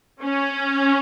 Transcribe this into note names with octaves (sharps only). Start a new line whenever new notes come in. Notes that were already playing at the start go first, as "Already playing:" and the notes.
C#4